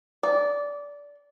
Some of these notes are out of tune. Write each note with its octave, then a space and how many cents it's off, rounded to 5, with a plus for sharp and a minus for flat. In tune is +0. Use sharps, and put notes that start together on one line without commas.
D5 -20